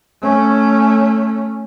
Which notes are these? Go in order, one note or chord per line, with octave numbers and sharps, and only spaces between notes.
A3 C#4